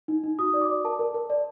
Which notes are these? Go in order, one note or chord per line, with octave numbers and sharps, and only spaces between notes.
D#4
D#4
F#4 D#6
D5
D6
D5
A#4 A5
A#4
A#4
D5